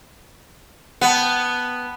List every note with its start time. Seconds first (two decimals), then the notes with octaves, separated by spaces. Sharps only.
1.01 B3 F#5 G5 A5